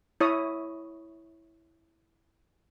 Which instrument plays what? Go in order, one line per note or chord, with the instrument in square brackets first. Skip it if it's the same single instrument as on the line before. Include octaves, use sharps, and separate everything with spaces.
[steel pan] E4 C#5 D#6